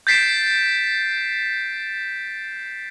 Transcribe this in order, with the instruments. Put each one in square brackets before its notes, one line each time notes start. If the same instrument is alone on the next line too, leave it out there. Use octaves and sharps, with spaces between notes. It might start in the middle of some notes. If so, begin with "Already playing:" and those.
[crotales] G6 A6 B6 C7 D7 E7